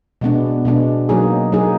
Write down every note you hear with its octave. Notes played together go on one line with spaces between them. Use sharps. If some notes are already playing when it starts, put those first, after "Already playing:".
B2 G#3 B3 D4
B2 G#3 B3 D4
F#3 A#3 D#4 G#4
F#3 A#3 D#4 G#4